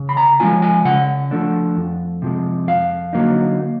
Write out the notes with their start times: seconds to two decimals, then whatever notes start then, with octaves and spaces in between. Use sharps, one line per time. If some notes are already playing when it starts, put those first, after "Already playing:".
Already playing: C#3
0.09 B5
0.17 A#5
0.40 F3 G#3 C#4 F4 G#5
0.62 G#5
0.85 C#3 F#5
1.31 F3 A3 D4
1.77 F2
2.22 C3 F3 G#3
2.67 F2 F5
3.13 D3 F#3 A#3 D#4